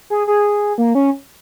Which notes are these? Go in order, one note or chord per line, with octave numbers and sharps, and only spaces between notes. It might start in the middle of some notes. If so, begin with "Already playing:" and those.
G#4
G#4
A#3
C#4